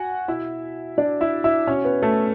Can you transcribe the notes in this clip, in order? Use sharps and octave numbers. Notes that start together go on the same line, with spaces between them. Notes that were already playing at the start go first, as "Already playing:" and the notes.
Already playing: F#4 F#5 G#5
B2 E4 E5
D4 D5
E4 E5
E4 E5
B2 C#4 C#5
B3 B4
A3 A4